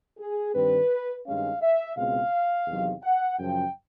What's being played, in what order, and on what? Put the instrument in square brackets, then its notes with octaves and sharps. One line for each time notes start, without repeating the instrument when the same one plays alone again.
[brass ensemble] G#4
G2 D#3 G3 C4 B4
G2 D#3 G#3 C#4 F5
E5
C#2 B2 G#3 C4 F5
E2 C3 D#3 F#3
F#5
F#2 C#3 F3 G5